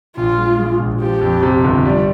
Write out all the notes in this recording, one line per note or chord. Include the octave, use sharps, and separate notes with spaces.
A#1 F4
G#3
G#3
A#1
F3 G4
F2
C3
G1
G3